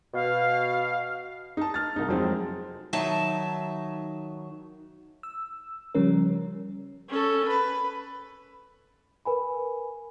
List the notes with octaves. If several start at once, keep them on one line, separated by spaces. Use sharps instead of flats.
B2 F5
D#4 A5
F6 A6
C2 D#4
F2 F#3 G#3 C4 D#4
D#3 F#3 D#4 E5 A5
E6
C#3 F3 G3 C#4 A#4
C#4 A4
B4
A#4 B4 G#5 B5